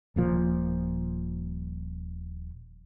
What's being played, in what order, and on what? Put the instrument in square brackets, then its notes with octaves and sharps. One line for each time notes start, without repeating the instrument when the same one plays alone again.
[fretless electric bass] D#1 A#2 F3